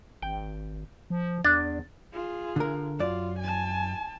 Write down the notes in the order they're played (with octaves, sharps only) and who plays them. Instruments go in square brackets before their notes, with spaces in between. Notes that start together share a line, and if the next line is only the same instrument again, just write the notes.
[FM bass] G#1 [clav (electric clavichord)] G5
[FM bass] F3
[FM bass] E2 [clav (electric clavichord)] D4 [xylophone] A6
[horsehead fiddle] F4 G#4
[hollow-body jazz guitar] D3 A#4
[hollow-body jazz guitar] F#2 D5 [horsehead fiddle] F4
[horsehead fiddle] G#5 A5